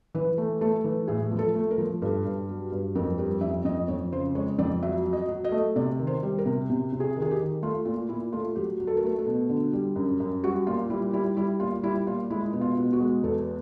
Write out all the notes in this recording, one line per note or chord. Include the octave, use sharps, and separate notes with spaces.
E3 B4
A3
A3 A4
E3
A2 G#4
F3
A4
A3
A#4
F3
G2 A4
G2
F#3
G2
F2 A#4
G3 A#4
F2 E5
F2 D#5
F2 C#5
C#3 C5
G#3 C#5
F2 D5
F#3 E5
F#3
D#5
F#3
D#5
A3
C3 D5
D#3
C5
G3
A#4
C3
C3
C3
G#4
D#3
G#4
G4
D#3
A3 F4
A#2 F4
A#2 E4
A3 F4
F#3 G4
F#3
A4
A#4
A3 A4
A4
B2
D3
G3
F#2
F#2
G3 F#4
A#2 F4
G3 E4
G3 E4
G3 E4
A#2 F4
G3 E4
A#2 F4
G#3 E4
B2
F4
B2
F#4
G#3
E2 A4